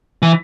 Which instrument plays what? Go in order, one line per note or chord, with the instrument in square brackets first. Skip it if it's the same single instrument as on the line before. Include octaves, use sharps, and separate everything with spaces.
[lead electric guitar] E3